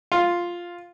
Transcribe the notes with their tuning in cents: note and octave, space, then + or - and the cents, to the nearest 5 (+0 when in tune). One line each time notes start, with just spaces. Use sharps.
F4 +0